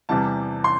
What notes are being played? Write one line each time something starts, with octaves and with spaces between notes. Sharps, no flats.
E2 C3 E3 G3 A5
C6